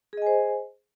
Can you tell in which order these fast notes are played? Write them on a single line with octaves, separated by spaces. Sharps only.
G#4 D#5 G#5 C5